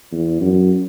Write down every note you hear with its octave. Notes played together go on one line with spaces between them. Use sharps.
E2
F#2